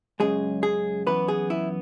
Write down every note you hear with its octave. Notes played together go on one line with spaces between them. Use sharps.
F#2 C#3 G#3 G#4
G#4
F#2 E3 B3 B4
G#4
E4